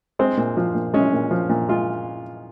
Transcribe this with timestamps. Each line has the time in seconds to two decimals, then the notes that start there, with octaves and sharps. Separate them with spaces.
0.19 G#3 C4
0.37 A#2
0.57 F3
0.75 A#2
0.94 G#3 C#4
1.13 A#2
1.31 F3
1.49 A#2
1.69 G#3 F4